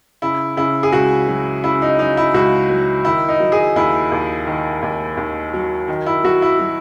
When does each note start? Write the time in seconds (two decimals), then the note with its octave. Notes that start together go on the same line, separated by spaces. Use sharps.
0.22 C#3 E4
0.57 C#3 E4
0.83 G#4
0.92 C#2 F#4
1.28 F#3
1.64 C#3 E4
1.82 D#4
1.99 F#3 D#4
2.17 E4
2.34 C#2 F#4
2.70 F#3
3.05 D#3 E4
3.29 D#4
3.40 F#3
3.52 G#4
3.76 D#2 E4
4.12 D#2
4.47 D#3
4.82 D#2
5.17 D#2
5.54 F#3
5.88 D#3
6.06 E4
6.24 F#3 F#4
6.42 E4
6.59 F#3